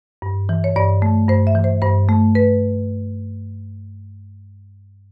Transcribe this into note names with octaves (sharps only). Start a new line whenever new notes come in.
G2
E3
C#5
G2 D5
A3
G2 C5
E5
E3
C5
G2 C5
A3
B4